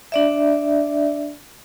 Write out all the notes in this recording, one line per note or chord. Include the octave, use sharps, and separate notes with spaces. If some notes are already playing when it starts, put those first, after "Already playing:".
D4 D5 E5